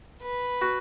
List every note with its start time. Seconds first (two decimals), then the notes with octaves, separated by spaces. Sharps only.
0.21 B4
0.62 F#4